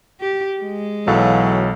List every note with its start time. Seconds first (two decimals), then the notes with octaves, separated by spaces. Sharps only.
0.20 G4
0.61 G#3
1.07 B1 E3 F#3 A4 F5